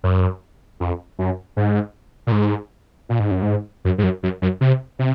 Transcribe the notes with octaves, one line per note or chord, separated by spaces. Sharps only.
F#2
F2
F#2
G#2
A#2
G#2
A#2
G#2
F#2
G#2
F#2
G#2
F#2
F#2
F#2
C3
C3